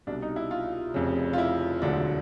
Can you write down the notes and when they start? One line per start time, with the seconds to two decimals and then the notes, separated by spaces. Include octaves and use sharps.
0.07 C2 B2 G3 D4
0.22 D#4
0.36 E4
0.51 F4
0.94 F1 F2 C#3
1.33 F4
1.38 E4
1.82 E1 D2 D3 F#3 D4